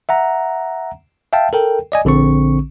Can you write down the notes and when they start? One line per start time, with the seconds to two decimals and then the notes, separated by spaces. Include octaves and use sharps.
0.09 E5 F#5 A#5
1.33 E5 F5 G5 A5
1.53 A4 A#4 G5
1.92 D5 D#5 G#5
2.05 A#1 D3 C4 C#6